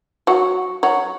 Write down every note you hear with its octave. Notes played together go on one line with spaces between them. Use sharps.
F#3 F#4
F#3 F#4